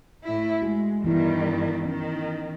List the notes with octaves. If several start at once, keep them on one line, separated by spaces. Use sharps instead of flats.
A2 E4
G#3 F#4
G2 D#3 E3 B3 E4
D#3 C#4